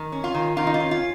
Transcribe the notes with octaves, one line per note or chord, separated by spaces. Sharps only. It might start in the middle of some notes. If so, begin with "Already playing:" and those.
Already playing: D#3
C#4
F4
D#3
D#3 F4
D#4
F4
C#4
F4